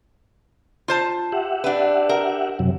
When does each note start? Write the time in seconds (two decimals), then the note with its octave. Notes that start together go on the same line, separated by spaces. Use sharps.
0.88 F4 C5 A5
1.32 G4 E5 F#5
1.64 D4 B4
2.09 A#4
2.59 F#2 C3 F#3